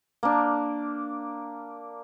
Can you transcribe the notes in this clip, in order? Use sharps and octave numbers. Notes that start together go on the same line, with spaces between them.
A#3 D4